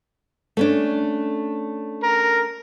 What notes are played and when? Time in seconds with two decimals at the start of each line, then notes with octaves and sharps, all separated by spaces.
0.57 A3 C#4 D4
2.03 A#4